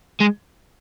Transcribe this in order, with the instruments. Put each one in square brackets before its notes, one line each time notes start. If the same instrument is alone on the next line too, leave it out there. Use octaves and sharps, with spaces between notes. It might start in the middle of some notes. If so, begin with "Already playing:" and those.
[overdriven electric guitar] G#3